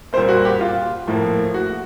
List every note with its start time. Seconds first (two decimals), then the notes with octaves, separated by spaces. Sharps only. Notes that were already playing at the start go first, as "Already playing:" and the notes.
0.13 A#2 G3 A#3 C5
0.28 F#4
0.45 G4
0.61 F4
1.07 A2 F3 A#3
1.54 F#4